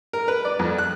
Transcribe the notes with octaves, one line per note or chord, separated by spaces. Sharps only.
A#4
B4
D5
F2
F#6